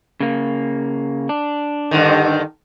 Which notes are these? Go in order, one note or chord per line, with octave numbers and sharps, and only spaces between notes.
C#3 A#3
D4
G2 D3 D#3